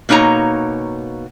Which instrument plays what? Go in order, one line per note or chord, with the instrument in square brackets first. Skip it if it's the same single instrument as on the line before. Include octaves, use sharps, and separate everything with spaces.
[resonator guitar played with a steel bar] B2 A#3 D#4 C#5 A#5